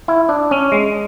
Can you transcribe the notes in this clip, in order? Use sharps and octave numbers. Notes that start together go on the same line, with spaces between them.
E4
D4
C#4
G#3